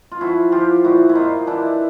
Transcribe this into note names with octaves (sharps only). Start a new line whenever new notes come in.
F4
F3 E4 F#4
F3 F4 G4
A#2 E4 F#4
E4
A#2 D#4 F4
E3 D4 E4